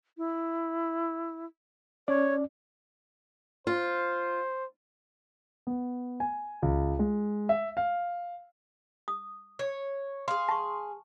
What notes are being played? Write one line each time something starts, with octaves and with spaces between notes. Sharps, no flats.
E4
C#4 C#5 D5
F4 C5
B3
G#5
C#2
G#3
E5
F5
D#6
C#5
G#4 F5 C6
A5 C#6